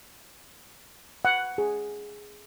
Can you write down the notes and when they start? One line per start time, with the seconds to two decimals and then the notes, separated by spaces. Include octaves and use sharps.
1.25 F#5
1.58 G#4